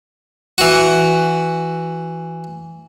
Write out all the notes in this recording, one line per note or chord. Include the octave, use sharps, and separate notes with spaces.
E3 F#4